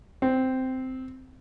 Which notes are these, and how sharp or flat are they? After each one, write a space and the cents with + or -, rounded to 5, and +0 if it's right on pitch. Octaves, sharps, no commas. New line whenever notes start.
C4 -10